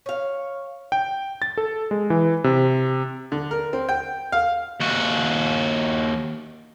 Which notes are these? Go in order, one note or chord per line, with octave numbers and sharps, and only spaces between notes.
C#5 F5
G5
A6
A4
G#3
E3
C3
D3
A#4
C4
G5
F5
D#2 F#4